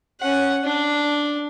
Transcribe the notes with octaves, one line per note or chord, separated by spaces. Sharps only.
C#4 F#5
D4